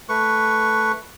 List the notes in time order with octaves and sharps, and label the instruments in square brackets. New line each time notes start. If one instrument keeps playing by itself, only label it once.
[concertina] A3 B4 C#6